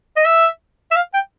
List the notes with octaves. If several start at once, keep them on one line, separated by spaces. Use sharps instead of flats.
D#5
E5
E5
F5
G5